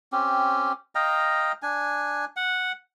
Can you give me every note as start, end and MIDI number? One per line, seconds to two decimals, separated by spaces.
0.12 0.73 60
0.12 0.73 61
0.12 0.73 67
0.95 1.52 75
0.95 1.52 77
0.95 1.52 79
0.95 1.52 82
1.62 2.25 62
1.62 2.25 80
2.36 2.72 78